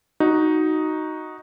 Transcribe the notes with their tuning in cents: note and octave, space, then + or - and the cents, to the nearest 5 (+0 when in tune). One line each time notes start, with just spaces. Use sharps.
D#4 +0 F#4 +0